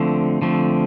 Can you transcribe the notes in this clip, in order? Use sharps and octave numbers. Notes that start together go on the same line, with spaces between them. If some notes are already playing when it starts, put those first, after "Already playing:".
Already playing: D3 F3 A3 C4
D3 F3 A3 C4